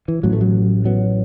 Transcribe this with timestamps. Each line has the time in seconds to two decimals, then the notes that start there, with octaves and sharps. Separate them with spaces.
0.08 E3
0.23 A1 A2 F#3
0.33 A3
0.41 F#3
0.85 F#3 B3